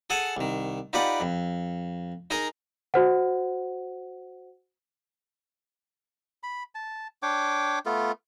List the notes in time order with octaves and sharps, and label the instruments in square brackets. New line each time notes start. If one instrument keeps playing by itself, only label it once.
[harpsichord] G#4 A4 F#5 G#5 A5
C2 D#3
D#4 F4 G4 B4 D5 F#5
F2
D#4 G#4 A#4 D#5 A#5
[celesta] F#4 C5 F#5
[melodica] B5
A5
D4 C#5 G5 D6
A3 B3 F4 A4